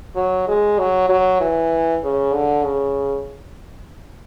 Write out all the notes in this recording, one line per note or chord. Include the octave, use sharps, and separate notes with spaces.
F#3
G#3
F#3
F#3
E3
C#3
D3
C#3